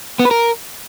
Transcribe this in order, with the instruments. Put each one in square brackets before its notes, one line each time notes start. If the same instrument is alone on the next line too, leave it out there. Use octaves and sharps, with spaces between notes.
[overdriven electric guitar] B3
B4
A#4